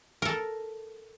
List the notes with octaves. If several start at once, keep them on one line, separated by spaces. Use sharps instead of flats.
A4 A#4